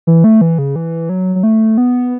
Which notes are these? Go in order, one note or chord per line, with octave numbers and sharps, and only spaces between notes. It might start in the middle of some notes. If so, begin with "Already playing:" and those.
E3
A3
E3
C#3
E3
F#3
F#3
A3
B3